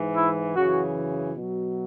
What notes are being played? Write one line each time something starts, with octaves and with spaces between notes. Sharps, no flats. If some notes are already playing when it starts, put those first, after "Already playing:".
Already playing: G#2 E3
E4
F#2 C#3 E3 F#4
B2 F#3